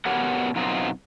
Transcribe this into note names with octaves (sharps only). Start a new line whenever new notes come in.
B2 B3 G4 A#4 C#5 F#5
F#2 B2 F#3 C4 D#4 F4